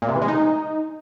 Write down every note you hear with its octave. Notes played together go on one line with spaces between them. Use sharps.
A#2
C3
E3
G#3
D#4